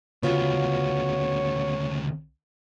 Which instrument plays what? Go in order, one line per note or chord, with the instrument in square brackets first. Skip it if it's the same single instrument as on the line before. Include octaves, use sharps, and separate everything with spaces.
[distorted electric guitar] D2 C#3 [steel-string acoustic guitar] B3 F4 F#4 [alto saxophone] C#5